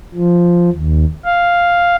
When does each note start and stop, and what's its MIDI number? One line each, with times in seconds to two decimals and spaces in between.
0.14 0.70 53
0.72 1.05 39
1.25 1.97 77